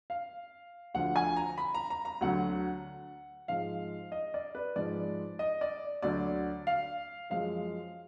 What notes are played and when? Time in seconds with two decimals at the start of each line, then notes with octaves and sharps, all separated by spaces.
0.10 F5
0.94 D2 D3 F3 F#5
1.16 G#5
1.36 A#5
1.58 B5
1.74 A#5
1.90 A#5
2.05 A#5
2.21 D2 D3 F#3 F#5
3.48 G#2 F3 G#3 F5
4.12 D#5
4.34 D5
4.55 B4
4.76 G#2 F3 G#3 D5
5.39 D#5
5.61 D5
6.02 D2 D3 F#3 D5
6.67 F5
7.30 F#2 F3 G#3 F5